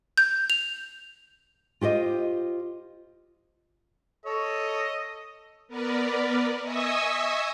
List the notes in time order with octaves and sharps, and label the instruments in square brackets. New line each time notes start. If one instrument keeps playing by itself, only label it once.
[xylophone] G6
F7
[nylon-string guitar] F4 G4 C5 D#5
[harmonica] A4 C#5 C#6 [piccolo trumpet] D#5
[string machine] B3 A#4 B4 D5
D#5 E5 G#5 C#6 D#6 E6